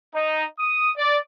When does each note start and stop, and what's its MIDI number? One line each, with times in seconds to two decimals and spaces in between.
0.13 0.43 63
0.58 0.89 87
0.95 1.16 74